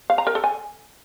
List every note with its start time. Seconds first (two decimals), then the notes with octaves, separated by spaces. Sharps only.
0.10 F5
0.18 A#5
0.27 A#4
0.35 A4
0.44 G#5